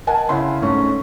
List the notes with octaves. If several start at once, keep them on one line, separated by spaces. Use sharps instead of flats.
A#4 D#5 F#5 G#5 A5
C#3 E4 F#5 C6
G#2 A3 C#4